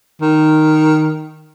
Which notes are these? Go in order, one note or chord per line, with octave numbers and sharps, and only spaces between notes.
D#3